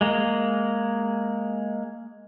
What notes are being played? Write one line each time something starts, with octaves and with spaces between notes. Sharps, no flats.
G#3 A#3